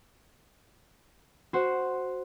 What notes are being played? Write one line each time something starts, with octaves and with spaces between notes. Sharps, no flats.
F#4 C5